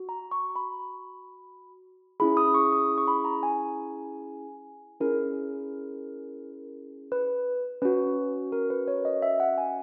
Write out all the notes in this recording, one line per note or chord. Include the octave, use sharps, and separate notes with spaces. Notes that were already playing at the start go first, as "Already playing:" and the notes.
Already playing: F#4
A#5
C#6
B5
C#4 E4 G#4 B5
D#6
C#6
D#6
C#6
B5
A#5
G#5
C#4 E4 G#4 A#4
B4
C#4 F#4 B4
A#4
B4
C#5
D#5
E5
F#5
G#5